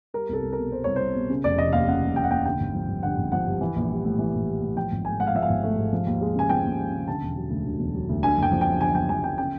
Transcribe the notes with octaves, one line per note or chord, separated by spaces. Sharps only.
G3 A#4
C2 A4
C2
A#4
B2
G3 C5
C2 C#5
C2 C5
B2
C#3
F1 D5
F1 D#5
D#2 F5
C#3 F#5
F1
F1 G5
F#5
D#2 G5
D3 G5
G#1
F3
G2
D3 F#5
G#1
F3 F#5
G2
E3
A#1
G3
A2
E3
A#1
G3
A2
F3 G5
G#1
A3 G#5
G#2 F#5
F5
F3 E5
F5
G#1
A3
G#2
F3
D#2
G#3
C#3 G#5
F3 G5
D#2
G#3
C#3
D3 A5
E1
F#3
D2
D3
E1
F#3
D2
D3 G#5
F#1 G5
F3
G5
F#2
D3 G#5
F#1 G5
F3 G#5
F#2 G5
C#3 G5